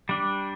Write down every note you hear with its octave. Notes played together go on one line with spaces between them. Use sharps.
G3 D4